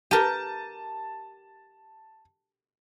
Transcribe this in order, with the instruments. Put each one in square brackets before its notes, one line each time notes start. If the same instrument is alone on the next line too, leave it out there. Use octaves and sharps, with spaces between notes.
[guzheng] G4 A#4 [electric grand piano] A5 D#7